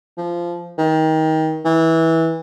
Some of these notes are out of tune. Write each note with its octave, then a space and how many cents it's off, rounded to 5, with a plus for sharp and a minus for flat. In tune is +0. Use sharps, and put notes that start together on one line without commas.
F3 -15
D#3 +25
E3 -20